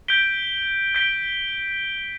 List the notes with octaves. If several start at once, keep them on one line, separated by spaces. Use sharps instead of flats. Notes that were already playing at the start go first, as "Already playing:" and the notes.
G6 B6 D7 G7
G6 B6 D7 G7